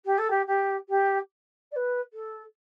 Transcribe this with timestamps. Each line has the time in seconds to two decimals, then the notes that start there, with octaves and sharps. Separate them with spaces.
0.05 G4
0.18 A4
0.30 G4
0.47 G4
0.88 G4
1.71 D5
1.75 B4
2.13 A4